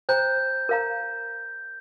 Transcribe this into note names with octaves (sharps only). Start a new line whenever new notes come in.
C5 G5 A#5 G6
A#4 F5 A#5